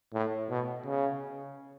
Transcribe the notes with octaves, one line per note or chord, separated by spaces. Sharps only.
A2
B2
C#3